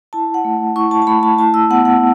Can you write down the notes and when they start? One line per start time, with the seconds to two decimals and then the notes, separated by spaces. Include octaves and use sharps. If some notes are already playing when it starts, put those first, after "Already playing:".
0.13 E4 A5
0.34 F#5
0.45 A3
0.76 E4 C#6
0.91 A5
1.02 A5
1.07 A3 B5
1.23 A5
1.38 E4 A5
1.54 E6
1.70 B3 F#5
1.85 F#5